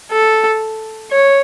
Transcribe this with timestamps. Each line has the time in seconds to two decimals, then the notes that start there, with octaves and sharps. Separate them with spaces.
0.11 A4
1.12 C#5